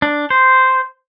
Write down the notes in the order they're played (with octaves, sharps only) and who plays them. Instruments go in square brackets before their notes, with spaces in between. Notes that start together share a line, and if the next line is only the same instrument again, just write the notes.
[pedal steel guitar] D4
C5